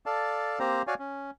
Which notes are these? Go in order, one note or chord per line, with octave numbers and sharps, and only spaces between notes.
A4 D5 F5 A5
A#3 C4 G4 C5 A#5
F#4 C#5 D5 F5 G#5
C#4